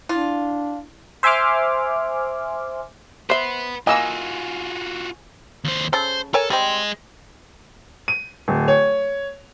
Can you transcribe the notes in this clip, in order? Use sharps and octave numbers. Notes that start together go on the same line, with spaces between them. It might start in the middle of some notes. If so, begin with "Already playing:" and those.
D4 E4 F4
C5 E5 G#5 C6 D6 F6
B4 C5 E5 F#5 C6
E3 A#3 F4 F#4 D#5 G#5 A#5 E6
D#2 C5
C#3 A4 C5
A4 A#4 C#5 G#5
G3 C4 G#4 D#5
D#7
D1
C#5